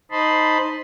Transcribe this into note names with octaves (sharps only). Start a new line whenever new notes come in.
D#4 C5 D#5 A5 B5 C6